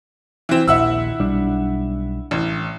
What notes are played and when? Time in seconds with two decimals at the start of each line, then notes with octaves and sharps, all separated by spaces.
0.49 E3 C4
0.68 A#1 D#2 E4 F#5 E6
1.20 B1 G3 D4
2.31 A1